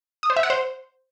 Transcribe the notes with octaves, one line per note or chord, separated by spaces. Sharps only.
D#6
C5
E5
F#5
C5